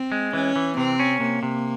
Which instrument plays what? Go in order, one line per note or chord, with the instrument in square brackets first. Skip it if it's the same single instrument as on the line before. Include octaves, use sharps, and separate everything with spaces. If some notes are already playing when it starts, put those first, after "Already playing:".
Already playing: [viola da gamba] C4
[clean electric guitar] G#3
[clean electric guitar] E3 [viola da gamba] C#4
[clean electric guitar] E3
[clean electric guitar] C3 [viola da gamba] C4
[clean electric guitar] C#4
[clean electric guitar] C3 [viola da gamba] A#3
[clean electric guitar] C3